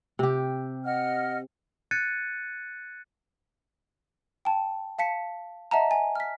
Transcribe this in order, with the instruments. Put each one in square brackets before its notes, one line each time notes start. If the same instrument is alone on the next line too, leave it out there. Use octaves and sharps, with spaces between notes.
[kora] C3 G4
[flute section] D#5 F#5 F6
[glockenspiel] F#6 G#6 A6 C#7 D#7
[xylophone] G5 A5
F5 A5 B6 C#7
D#5 E5 F#5 A5 A#5
G#5
F6 B6